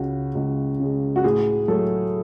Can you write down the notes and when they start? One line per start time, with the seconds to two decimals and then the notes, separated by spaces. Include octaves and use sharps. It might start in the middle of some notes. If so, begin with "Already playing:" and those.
Already playing: C#2 C#3 G#3 F#4
0.35 C#2
0.80 C#3 G#3
1.16 F#4
1.24 A2 G#4
1.68 F#3 A3 A4